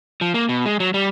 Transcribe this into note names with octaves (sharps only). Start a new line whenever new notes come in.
F3
A#3
B2
G#3
F#3
G3